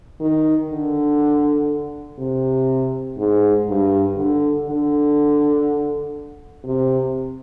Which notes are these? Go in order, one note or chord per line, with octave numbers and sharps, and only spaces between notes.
D#3
D3
C3
G#2
G2
D3
D3
C3